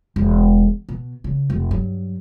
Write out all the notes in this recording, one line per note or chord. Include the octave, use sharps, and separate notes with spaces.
E1
B2
C#3
F1
G2 F#3